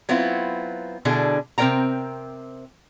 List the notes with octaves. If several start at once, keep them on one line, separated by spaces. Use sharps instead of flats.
F#3 B3 C4 E4 F4
B2 D3 D4 E4 G#4
C3 C4 A#4 D5 G5 A#5